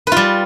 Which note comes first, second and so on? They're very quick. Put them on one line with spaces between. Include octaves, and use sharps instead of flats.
B4 F4 G3